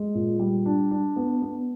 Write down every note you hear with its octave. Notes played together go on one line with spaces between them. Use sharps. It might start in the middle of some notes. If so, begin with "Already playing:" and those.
Already playing: G#3
A#2
G3
D4
D4
B3
B3